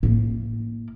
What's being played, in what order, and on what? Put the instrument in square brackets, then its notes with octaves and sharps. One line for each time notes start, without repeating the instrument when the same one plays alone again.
[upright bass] A2 A#3